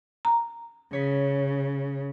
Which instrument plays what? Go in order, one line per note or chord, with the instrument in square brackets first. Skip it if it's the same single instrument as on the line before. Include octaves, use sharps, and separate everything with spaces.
[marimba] A#5
[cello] C#3 [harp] C#5 B6